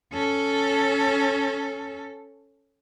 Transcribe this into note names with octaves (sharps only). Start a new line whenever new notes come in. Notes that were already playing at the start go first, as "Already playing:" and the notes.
C#4 A4